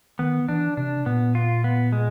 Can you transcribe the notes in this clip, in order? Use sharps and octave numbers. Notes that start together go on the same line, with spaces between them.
D#3 B3
E3 D4
C3 D4
A#2 B3
F4
B3
G#3